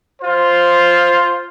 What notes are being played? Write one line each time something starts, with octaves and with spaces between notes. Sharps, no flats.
F4 C5